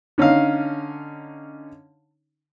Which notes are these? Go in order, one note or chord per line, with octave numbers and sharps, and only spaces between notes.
D3 C#4 D#4 F5